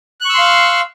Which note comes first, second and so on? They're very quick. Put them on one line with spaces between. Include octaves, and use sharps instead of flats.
F#6 C#6 E6 C6 F5